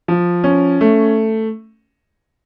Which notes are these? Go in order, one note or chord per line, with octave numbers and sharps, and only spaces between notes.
F3
C#4
A3